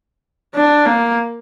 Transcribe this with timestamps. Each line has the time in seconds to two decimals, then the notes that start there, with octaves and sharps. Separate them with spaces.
0.54 D4
0.85 A#3